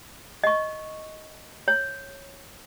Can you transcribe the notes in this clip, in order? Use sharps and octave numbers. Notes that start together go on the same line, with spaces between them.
D#5 C#6
C#5